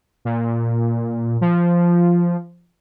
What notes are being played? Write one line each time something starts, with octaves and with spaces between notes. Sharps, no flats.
A#2
F3